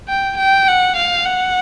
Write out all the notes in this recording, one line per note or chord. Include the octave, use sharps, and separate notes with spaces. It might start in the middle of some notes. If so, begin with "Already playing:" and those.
G5
G5
F#5
F5
F#5